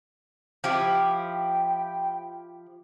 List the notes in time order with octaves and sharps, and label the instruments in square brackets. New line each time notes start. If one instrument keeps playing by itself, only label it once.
[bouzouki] F3 E4 G4 [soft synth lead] G5